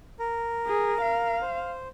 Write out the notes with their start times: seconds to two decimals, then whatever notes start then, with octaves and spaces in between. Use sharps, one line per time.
0.19 A#4
0.67 G#4
1.01 F5
1.41 C5